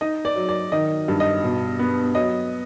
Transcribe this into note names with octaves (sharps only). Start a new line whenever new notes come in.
D#4 D#5
D5
F#3
D5
D#3 D#5
G2
D#5
B2
B3
F#3 D#5